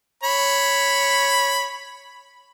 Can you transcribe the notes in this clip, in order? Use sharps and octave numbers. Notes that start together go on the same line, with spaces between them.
C#5 B5